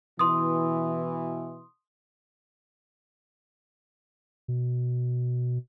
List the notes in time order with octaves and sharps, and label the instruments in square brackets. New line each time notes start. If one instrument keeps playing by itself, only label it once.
[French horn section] B2 E3 [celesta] C6 D#6
[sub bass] B2